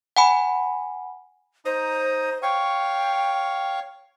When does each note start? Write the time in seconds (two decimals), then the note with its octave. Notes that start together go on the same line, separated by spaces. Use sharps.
0.16 F#5 G#5 B5
1.65 D#4 C5 A#5 D#6
2.43 C#5 F5 G5 C#6